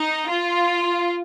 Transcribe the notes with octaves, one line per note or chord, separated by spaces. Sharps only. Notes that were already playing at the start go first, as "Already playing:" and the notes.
Already playing: D#4
F4